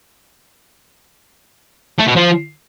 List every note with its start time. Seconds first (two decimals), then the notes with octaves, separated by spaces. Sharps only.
1.99 A3
2.08 B2
2.16 F3